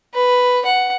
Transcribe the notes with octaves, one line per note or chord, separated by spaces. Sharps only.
B4
F#5